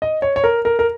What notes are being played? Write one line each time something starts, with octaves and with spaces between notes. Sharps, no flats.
D#5
C#5
C#5
A#4
A#4
A#4